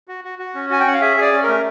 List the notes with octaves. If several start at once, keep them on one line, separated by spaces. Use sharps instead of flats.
F#4
F#4
F#4
C#4
F#4 G#5
G5
C#4 F#5
F5
G#4 E5
G#4 D5
C#4
A#4
A3